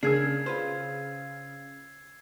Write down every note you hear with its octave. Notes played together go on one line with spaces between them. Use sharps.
C#3 D4 G#4 A#4 E6 G#6 C7
F4 B4 C5